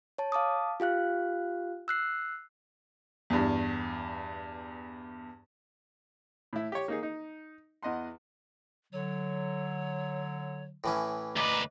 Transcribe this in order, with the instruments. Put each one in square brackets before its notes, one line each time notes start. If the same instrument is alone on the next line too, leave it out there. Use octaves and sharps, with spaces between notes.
[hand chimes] C#5 A5
F5 A5 D6 D#6
F4 G4 F5 F#6
E6 F#6 C7
[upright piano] E2 G2
[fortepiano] A2 E4
G4 C#5
A#3 D#4 G#4
D#4
E2 D#5 F#5 C6
[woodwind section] D3 F#3 [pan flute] C#5
[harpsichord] A2 E3 C#4
[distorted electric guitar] D2 B4 [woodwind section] D#5 A#5 B5 [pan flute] D6